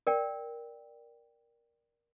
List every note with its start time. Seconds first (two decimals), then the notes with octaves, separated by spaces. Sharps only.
0.07 A#4 D5 G5